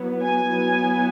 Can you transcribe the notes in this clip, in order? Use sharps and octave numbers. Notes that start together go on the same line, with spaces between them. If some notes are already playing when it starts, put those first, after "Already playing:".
Already playing: F#3 B3 E4
G#5
F#3 B3 E4